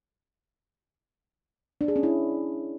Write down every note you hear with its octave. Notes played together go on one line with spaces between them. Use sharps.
D4
G#4
C#4
E4